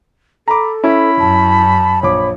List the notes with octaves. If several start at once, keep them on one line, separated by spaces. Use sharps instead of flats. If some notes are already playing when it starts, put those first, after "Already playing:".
A4 A#5 B5 D6
C#4 E4 B5
F#2 A5
A#1 C#5 D6